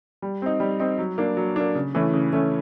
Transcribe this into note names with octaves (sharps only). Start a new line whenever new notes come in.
G3
C4 D#4
G3
C4 D#4
F#3
A#3 D4
F#3
A#3 D4
C#3
E3 A3 C#4
C#3
E3 A3 C#4